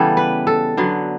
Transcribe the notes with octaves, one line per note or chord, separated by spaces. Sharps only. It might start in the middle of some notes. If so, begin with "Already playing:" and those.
Already playing: C#3 E3 G3 B3 G4 A4
B4
A4
D3 F#3 B3